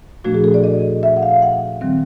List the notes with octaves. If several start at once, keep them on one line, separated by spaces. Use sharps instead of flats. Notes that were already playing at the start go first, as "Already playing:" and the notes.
A#2 F3 A3 D4 F#4
G#4
A4
D5
D#5
E5
F#5
F5
F#5
D#3 G3 C4